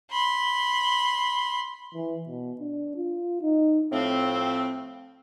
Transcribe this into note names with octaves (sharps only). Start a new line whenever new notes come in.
B5 C6
E3
B2
D4
F4
D#4
A2 F3 C4